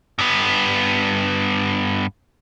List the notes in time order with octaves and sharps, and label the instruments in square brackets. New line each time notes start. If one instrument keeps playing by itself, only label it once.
[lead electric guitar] G2 B3